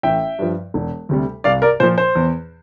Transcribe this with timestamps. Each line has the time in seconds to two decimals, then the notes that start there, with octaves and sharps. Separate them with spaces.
0.03 A1 E5 G5
0.39 G2 F3
0.74 E1
1.09 D2 C3 G3
1.44 C2 D5 F5
1.62 A#4 D5
1.80 A#2 F3 C5
1.98 C5
2.15 E2